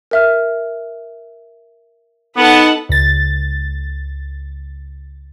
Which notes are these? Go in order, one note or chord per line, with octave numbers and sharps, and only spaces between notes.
A#4 E5 F6
B3 D#4 A4 B4 F#5 A5
C#2 A6